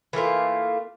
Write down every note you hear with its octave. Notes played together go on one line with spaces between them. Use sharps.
E3 A3 A#3 F4